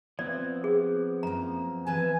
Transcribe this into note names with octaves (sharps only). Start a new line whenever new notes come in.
F3 B3 C4 D5
G#4
F#2 A#3 A#5
E3 B4 G#5 A5